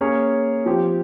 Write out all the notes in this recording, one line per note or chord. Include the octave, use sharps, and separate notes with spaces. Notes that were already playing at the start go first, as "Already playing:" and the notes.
A#3 C#4 G#4 C#5
F3 C4 G4